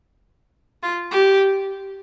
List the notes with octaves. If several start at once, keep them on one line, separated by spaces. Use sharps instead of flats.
F4
G4